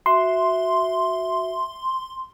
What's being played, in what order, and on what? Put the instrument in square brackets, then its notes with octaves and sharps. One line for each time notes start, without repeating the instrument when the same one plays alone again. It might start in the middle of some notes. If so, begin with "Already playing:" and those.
[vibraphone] F#4 E5 [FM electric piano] C6